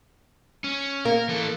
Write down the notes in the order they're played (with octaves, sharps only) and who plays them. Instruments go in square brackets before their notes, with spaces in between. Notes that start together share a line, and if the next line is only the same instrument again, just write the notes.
[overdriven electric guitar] C#4
[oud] A#3 [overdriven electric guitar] A#4
[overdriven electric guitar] E3 A4